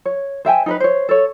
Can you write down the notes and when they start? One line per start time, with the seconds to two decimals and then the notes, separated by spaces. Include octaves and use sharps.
0.06 C#5
0.45 C5 E5 G5 G#5
0.66 D#4 A#4 B4
0.80 C5 C#5
1.09 A4 C#5